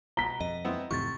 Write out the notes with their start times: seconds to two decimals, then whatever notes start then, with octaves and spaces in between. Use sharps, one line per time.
0.17 B2 A#5 B6 G7
0.41 F2 D#5
0.65 B3 C4 E4
0.91 F2 A2 C3 E3 C#6 A6